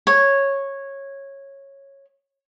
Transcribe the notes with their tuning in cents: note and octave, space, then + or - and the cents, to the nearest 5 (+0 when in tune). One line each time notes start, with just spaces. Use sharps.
C#5 -10